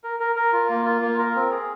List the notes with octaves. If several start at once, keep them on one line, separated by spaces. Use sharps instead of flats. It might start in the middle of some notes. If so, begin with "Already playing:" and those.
A#4
A#4
A#4
F4
A#3
F4
A#3
A#4
C4
G#4